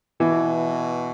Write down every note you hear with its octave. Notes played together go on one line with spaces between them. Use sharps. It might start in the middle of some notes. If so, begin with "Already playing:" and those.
B2 E3